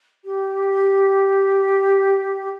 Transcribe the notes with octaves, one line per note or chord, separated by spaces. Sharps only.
G4